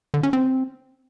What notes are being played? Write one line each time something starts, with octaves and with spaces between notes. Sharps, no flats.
D3
C#4
C4